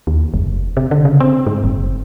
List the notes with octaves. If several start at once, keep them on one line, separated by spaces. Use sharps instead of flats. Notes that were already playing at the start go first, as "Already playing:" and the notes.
D#2
F#1
C3
D3
C#3
C4
G#2
F#1